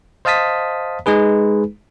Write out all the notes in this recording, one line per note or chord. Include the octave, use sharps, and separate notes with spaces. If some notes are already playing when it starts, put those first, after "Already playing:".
C5 D#5 F5 A5 D#6 B6
G#3 D#4 G#4 B4